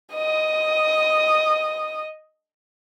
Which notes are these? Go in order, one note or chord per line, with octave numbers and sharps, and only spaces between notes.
D#5 D#6